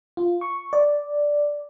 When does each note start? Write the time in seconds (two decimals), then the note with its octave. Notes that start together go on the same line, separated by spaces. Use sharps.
0.17 F4
0.41 C#6
0.73 D5